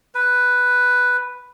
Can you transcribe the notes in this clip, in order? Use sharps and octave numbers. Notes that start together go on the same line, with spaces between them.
B4